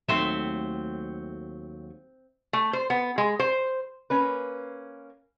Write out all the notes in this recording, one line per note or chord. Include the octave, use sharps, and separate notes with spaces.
D#2 F#3 A3 C4 C5 E5
A3
C5
B3
G#3
C5
A#3 C#4 B4